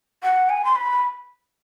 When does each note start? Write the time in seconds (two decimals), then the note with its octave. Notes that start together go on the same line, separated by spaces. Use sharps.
0.23 F#5
0.49 G#5
0.65 C6
0.76 B5